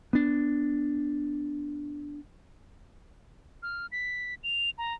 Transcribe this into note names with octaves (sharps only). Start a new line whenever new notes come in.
B3 D4
F6
B6
F7
A#5